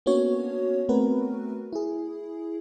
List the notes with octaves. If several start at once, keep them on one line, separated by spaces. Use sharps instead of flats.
A#3 B3 C#4 D4 F#4 C#5
A3 B3 C4 F#4 A#4 B4
E4 G#4